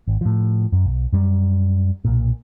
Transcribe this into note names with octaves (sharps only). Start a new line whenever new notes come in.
G#1
A2 F3
F#2
B1
F#2 G3
B1 A#2